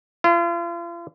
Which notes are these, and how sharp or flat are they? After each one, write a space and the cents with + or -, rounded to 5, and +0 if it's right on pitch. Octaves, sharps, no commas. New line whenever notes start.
F4 -40